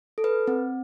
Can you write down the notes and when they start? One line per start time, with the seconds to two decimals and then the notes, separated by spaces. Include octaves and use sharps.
0.18 A4
0.24 B4
0.48 C4